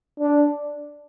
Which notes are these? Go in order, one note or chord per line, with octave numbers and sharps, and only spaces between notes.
D4